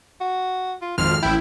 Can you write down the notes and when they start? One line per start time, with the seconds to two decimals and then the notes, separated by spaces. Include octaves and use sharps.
0.21 F#4
0.81 F4
0.98 G#1 F2 C5 F6
1.22 A1 E4 G5